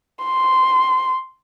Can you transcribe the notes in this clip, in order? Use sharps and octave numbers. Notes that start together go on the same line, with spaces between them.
C6